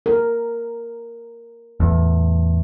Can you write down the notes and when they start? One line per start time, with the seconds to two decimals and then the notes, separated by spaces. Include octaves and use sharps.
0.06 A#4
1.80 E2 A2